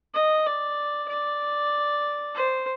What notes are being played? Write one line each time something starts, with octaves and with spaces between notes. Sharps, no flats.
D#5
D5
D5
C5